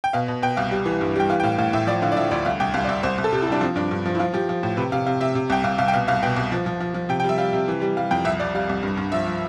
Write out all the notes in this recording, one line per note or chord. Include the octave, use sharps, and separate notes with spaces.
G5
B2 F5
B2
B2 G5
C2 F5
G3
E3
G2
G3 G5
E3 F5
G5
A2 F5
A2 F5
A2 E5
F3 D5
D3 F5
D5
F3 E5
D2 D5
C2 F5
C2 G5
C2 F5
D5
C2 E5
C2 C5
C2
A4
C3 G4
E4
G3 D4
F3 C4
G2 D4
G2
F3
E4
F3 F4
F3 G4
F3
A2
C3 B4
C3 F5
C3 F5
C3 E5
C3
C2 G5
C2 F5
C2 F5
G5
B2 F5
C2 F5
B2 G5
C2
F3
F3
F3
F3
C3 G5
G5
G3
E5
G3 F5
C3
E3
G3
G3 F5
F2 G5
C2 E5
C2 D5
G3 F5
C2
G2
G2
F3 E5
F3